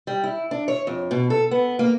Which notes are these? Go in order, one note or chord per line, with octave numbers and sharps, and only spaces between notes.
G3
E4
D4
C#5
F2
B2
A4
B3
A#3